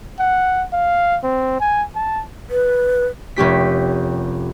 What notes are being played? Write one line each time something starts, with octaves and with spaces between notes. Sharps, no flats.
F#5
F5
C4
G#5
A5
B4
F1 C#4 G4 B6